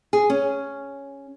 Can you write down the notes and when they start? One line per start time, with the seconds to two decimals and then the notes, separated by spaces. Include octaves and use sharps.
0.13 G#4
0.30 C#4